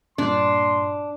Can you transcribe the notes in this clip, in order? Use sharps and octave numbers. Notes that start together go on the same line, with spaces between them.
G2 A#2 D4 C6